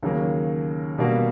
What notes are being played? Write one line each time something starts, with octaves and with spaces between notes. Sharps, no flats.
D#2 C#3 F#3 A#3
B2 G3 A#3 D4 F#4